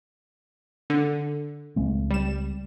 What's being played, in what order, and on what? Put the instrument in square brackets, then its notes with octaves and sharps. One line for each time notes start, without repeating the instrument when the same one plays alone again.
[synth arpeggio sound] D3
[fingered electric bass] C#2 G#3 C4
[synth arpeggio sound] G3 E7